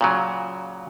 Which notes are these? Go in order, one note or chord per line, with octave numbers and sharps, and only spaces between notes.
A#2 C#3 F#3